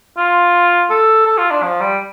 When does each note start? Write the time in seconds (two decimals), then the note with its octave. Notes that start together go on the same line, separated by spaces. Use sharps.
0.17 F4
0.90 A4
1.26 A4
1.38 F4
1.51 D4
1.63 F3
1.81 G3